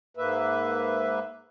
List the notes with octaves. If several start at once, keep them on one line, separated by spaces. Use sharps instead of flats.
G#2 A#3 B4 E5